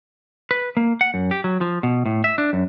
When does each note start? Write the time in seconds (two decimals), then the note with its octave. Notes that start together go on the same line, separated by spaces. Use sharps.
0.51 B4
0.77 A#3
1.01 F#5
1.14 F#2
1.31 G4
1.44 F#3
1.61 F3
1.83 B2
2.06 A2
2.24 E5
2.38 D4
2.53 F#2